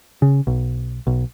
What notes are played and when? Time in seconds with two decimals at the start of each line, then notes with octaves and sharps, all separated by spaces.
0.22 C#3
0.47 B1
1.07 B1